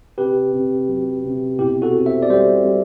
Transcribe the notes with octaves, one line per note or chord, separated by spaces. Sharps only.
C3 G4 B4
C3
F#3
C3
B2 E4 G4
F#4 A4
C4
C5 E5
D5
G3 C5 E5
G3